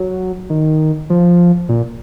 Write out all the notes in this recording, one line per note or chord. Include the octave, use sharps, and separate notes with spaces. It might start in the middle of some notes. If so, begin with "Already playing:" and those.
Already playing: F#3
D#3
F3
A#2